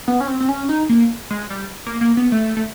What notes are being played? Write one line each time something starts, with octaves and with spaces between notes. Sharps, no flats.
B3
C#4
C4
C4
C#4
D#4
A#3
G#3
G3
A#3
A#3
B3
A3
A3